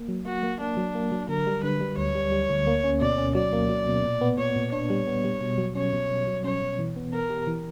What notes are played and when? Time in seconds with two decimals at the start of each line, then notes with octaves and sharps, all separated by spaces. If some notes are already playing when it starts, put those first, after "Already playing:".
Already playing: A#3
0.09 F#3
0.26 A#3 F#4
0.43 A#3
0.60 A#3 D4
0.77 F#3
0.95 A#3
1.12 F#3
1.29 D3 A#4
1.47 G3
1.63 D3 B4
1.81 G3
1.97 D2 C#5
2.15 G3
2.32 G3
2.50 D2
2.67 A#3
2.84 C#4
3.01 B2 D5
3.18 C#4
3.35 F#3 D5
3.53 A#3
3.69 F#3
3.86 B2
4.05 A#2
4.21 B3
4.38 A#2 C#5
4.56 A#2
4.72 D4 C#5
4.90 G3
5.07 B3
5.24 G3
5.41 B2
5.58 F#3
5.75 C#4 C#5
5.93 B2
6.10 B2
6.27 F#3
6.44 C#4 C#5
6.62 B2
6.79 E3
6.96 B3
7.13 B3 A#4
7.30 G4
7.47 E3